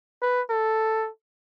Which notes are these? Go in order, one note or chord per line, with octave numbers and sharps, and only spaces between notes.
B4
A4